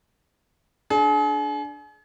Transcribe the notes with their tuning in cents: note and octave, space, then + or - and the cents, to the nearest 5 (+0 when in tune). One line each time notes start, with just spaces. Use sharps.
D4 +0 G#4 +40